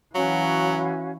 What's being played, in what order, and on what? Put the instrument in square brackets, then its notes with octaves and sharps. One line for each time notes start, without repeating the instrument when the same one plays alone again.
[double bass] E3 [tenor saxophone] F#3 [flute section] C#4 F#4 F5